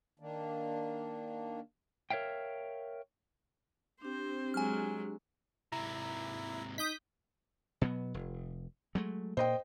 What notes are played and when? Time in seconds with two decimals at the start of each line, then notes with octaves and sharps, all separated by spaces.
0.20 D#3 A#3 D4
2.10 A#4 C#5 E5 F5 G5
4.02 C4 D4 G4 C5
4.54 F#3 G#3 G#5 F6
5.72 G#2 C3 E4 A#5
6.78 D#4 D#6 G6 B6
7.81 B2 F#3 B3
8.14 F1
8.95 F#3 G#3 A3
9.37 A#2 C5 D#5 G5